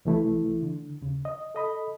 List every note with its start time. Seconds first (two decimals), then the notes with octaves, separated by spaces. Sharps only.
0.05 C2 E3 A3 E4
0.63 D3
1.01 D#2 C#3
1.25 D#5
1.55 A4 D#5 B5